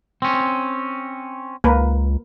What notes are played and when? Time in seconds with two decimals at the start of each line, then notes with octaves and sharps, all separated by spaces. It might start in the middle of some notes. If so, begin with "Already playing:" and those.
0.22 C4 C#4
1.64 C#2 A#3 A#4 B4